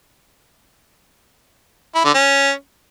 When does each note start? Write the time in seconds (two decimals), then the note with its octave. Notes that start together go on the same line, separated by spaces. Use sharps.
1.95 E4
2.05 D3
2.14 C#4